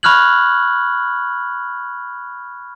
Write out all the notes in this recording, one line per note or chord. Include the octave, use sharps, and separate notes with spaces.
B5 C#6 F6 F#6 G#6 F#7